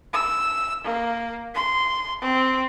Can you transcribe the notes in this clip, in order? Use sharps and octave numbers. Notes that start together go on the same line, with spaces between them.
E6
A#3
C6
C4